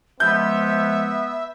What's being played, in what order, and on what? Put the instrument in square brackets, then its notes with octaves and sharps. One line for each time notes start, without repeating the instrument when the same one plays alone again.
[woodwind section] F3 G#3 [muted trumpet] B3 [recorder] E5 [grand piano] G6